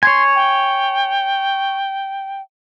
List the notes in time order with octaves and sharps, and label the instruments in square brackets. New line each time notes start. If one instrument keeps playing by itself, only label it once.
[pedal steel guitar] C#5 G#5 [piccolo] C6
[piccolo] G5